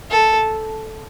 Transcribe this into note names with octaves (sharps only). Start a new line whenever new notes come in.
A4